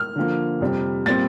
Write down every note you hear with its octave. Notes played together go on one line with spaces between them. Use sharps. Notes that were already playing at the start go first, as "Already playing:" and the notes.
Already playing: F6
D3 F3 A#3
F2 C3 G3
A#2 G3 C4 A6